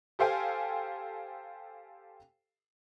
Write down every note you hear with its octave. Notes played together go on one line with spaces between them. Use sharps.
G4 A4 C5 F5 G5 G#5